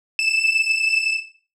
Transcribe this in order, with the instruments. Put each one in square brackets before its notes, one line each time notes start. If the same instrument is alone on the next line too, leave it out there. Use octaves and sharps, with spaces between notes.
[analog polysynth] E7